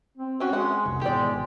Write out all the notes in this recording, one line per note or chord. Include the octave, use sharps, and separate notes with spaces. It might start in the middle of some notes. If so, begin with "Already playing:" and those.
C4
C4 C#4 F#4
G#3 F#5
F1 C2
G#1 B2 E3 G#3 G4 D5